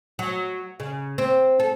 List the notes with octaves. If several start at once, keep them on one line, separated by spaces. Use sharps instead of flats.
F#3
C#3
C4
A4